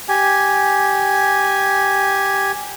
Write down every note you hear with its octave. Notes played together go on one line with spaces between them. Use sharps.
G4 G#5